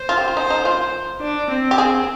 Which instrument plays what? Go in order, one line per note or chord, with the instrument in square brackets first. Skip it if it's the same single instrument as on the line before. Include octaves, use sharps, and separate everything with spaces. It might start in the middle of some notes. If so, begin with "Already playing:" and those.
Already playing: [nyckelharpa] C5
[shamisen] F4
G4
F4
[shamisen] D#4 [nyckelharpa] C5
[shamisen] D#4
[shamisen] F4 [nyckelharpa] C5
[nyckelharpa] D4
C4
[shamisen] G4
[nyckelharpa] C4 [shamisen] G#4